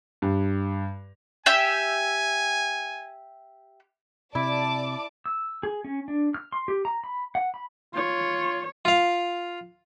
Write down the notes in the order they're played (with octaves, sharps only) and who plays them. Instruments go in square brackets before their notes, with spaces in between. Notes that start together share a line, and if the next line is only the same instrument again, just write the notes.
[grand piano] G2
[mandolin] G4 E5 G5 [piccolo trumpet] G#5
[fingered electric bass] C3 [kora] E4 [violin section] D5 A5 D6
[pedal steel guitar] E6
G#4
C#4
D4
F6
C6
G4
A#5
B5
F#5
B5
[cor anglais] F4 [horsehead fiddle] C#5
[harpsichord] F4 F5